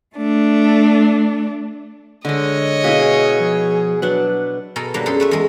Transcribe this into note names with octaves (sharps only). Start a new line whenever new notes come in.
A3 D4
D3 G#3 C#5 D#5
B2 E4 G#4 F5
F3
F#3 D4 B4 F#5
B2 A4 A#4 G#5
F#3 G3 A#3 D4
F#2 G#4 A4 C6
A3 B4 E5
E2 G#3